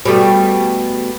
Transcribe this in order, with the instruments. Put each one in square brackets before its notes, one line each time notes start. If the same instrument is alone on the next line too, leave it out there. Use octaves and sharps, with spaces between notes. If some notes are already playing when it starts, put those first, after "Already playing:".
[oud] B2 G3 A3